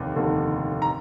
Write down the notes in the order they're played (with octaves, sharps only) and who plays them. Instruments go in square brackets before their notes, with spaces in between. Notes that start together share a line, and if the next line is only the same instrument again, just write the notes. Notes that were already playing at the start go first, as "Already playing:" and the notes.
Already playing: [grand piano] F1 D#2 D3
F1 D#2 D3
A#5